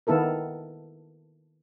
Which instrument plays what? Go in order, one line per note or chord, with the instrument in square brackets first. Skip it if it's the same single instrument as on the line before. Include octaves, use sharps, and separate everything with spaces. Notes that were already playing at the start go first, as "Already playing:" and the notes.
[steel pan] D#3 B3 E4 A4 A#4